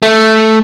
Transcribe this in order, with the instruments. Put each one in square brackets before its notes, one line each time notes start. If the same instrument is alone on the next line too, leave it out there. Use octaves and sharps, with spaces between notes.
[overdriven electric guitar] A3